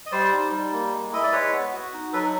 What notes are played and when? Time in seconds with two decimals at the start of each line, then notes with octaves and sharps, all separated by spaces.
0.06 D#5
0.12 G3 C5 D5
0.33 D#4
0.52 G3
0.73 A#3
0.92 G#3
1.13 E4 D#5
1.23 D5
1.32 G#3 B4 C#5
1.53 B3
1.73 F#4
1.94 D#4
2.13 F#3 A4 B4